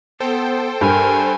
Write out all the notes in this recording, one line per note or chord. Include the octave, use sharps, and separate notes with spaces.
B3 A4 C5 G5
G2 A#4 G#5